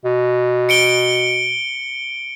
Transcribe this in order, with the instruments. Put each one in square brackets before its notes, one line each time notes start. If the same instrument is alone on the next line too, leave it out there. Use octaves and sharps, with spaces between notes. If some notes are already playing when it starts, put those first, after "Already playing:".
[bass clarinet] B2
[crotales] C#7 D7 G7